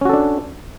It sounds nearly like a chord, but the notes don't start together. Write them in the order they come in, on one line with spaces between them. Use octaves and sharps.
C#4 F#4 A4 D4